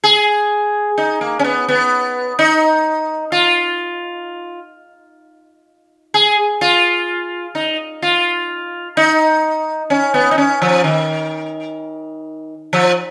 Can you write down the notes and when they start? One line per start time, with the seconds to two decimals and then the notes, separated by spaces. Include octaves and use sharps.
0.04 G#4
0.98 D#4
1.21 A#3
1.39 C#4
1.44 B3
1.68 B3
2.39 D#4
3.32 F4
6.14 G#4
6.61 F4
7.55 D#4
8.02 F4
8.97 D#4
9.90 C#4
10.14 B3
10.31 D#4
10.38 C#4
10.62 F3
10.84 D#3
12.73 F3